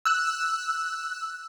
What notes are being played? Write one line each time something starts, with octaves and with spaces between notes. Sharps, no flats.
E6 F#6